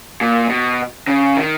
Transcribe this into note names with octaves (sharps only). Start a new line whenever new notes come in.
A#2
B2
C#3
D#3